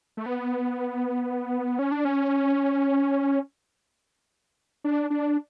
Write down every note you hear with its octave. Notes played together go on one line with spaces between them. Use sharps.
A3
B3
C#4
D4
C#4
D4
D4